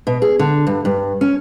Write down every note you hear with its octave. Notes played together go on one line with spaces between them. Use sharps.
B2
G#4
D3
G2
G2
C#4